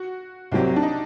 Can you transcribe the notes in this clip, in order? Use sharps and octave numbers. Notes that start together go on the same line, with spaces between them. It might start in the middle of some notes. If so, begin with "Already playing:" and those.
Already playing: F#4
C2 C3 F#3 C4 G4
D4
D#4